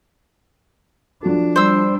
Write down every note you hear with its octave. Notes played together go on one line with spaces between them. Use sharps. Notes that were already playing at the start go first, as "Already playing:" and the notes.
F3 D4 F#4 A4
G3 C5 E6